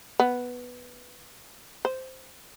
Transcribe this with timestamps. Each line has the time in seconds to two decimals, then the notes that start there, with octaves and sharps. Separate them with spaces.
0.20 B3
1.85 C5